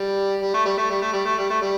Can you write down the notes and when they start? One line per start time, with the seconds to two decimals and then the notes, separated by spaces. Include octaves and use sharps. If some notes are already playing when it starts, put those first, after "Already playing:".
Already playing: G3
0.42 G3
0.54 A3
0.66 G3
0.78 A3
0.90 G3
1.02 A3
1.13 G3
1.26 A3
1.38 G3
1.50 A3
1.62 G3